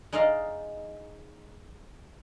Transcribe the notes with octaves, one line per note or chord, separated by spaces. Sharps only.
G#3 D#4 D5 D#5 F5